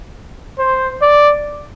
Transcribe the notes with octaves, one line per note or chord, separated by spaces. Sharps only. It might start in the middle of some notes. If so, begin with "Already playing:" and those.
C5
D5